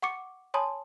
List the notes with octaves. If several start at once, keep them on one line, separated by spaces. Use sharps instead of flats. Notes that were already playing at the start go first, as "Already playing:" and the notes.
F#5 C#6 D6 C#7
C#5 G#5 A5 B5 C6 D#6